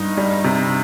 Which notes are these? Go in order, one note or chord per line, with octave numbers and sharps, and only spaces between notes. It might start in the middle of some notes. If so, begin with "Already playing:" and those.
Already playing: G2 D#4
G3
C3